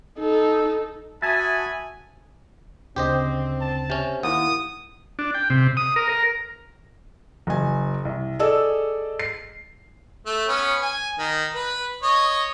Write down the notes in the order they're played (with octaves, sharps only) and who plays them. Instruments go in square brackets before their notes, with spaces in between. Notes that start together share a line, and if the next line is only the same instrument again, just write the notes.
[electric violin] D#4 A4
[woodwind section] F#4 B5 [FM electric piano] E5 A5 D#6 [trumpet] G#5 [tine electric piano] G#6 A6
[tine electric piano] D2 C#3 D4 [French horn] C4 [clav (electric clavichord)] G4 C5 D#5
[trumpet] A5
[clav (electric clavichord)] C3 C#4
[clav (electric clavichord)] D#2 [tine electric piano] E4 F5 F#5 [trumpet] D#6
[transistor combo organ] D4
G5
C3
D#6
A#4
A#4
[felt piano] F#1 G#5
C2
G#4 A4 D5 D#5 E6
C7
[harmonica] A3
B3 C#4
G#5
D#3
B4
C#5 D#5 D#6